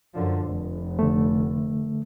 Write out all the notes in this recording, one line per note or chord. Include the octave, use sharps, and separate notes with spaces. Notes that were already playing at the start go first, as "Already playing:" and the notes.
F#2 D3 F3
F1
D3 A3